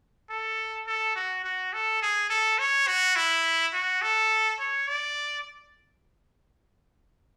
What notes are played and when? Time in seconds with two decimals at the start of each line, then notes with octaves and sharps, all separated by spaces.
0.30 A4
0.87 A4
1.16 F#4
1.44 F#4
1.73 A4
2.02 G#4
2.30 A4
2.59 C#5
2.87 F#4
3.16 E4
3.73 F#4
4.02 A4
4.59 C#5
4.88 D5